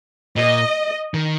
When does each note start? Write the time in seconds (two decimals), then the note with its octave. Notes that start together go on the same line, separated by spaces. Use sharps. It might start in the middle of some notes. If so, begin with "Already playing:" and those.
0.36 A#2 D#5
1.14 D#3